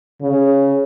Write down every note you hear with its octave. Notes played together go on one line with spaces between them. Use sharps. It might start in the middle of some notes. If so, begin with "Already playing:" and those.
C#3